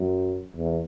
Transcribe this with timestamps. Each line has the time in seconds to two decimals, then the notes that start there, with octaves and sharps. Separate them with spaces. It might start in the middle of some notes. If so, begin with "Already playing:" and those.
Already playing: F#2
0.56 E2